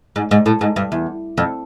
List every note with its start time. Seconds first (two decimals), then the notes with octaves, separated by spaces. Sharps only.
0.16 G#2
0.31 G#2
0.46 A2
0.61 G#2
0.76 G2
0.92 E2
1.38 F2